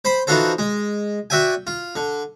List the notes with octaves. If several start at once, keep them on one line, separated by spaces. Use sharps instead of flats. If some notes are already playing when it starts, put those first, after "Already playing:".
C5 B5 C6
E3 D#4 F4 F#4 A4 C5
G#3
F#4 D5 E5 G5 G#5
F4
D3